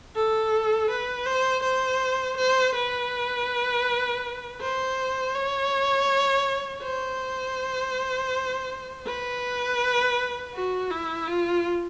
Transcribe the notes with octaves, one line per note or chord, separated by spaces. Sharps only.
A4
B4
C5
C5
C5
B4
C5
C#5
C5
B4
F#4
E4
F4